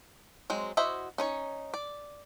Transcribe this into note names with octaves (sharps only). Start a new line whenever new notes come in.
F#3 G#3 C4
E4 F#4 C5 D#5 E5
C#4 D#4 C#5
D5